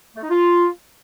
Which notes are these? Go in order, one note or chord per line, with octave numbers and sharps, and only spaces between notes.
A3
D#4
F4